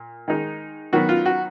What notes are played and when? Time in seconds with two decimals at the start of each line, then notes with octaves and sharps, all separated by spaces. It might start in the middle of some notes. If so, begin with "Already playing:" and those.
Already playing: A#2
0.28 D#3 G#3 D#4
0.93 D#3 F#3 B3 F#4
1.09 F4
1.26 F#4